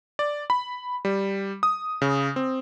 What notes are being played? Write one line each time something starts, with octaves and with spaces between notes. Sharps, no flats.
D5
B5
G3
D#6
C#3
C4